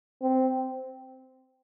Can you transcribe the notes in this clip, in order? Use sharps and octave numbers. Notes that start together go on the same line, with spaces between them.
C4